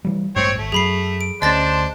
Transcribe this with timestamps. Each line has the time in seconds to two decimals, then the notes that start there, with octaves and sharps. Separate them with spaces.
0.05 E3 G3
0.36 A1 G2 G#3 C4 C#5
0.59 G#1 A3
0.72 F#2 G#4 B5 C7
1.21 D7
1.42 D2 C#4 D4 C5 D#5 A5 A6 A#6